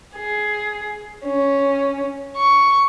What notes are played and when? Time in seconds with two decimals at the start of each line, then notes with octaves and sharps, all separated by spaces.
0.15 G#4
1.25 C#4
2.37 C#6